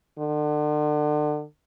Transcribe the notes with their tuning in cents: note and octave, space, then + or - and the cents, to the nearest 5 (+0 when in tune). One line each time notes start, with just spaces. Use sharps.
D3 +35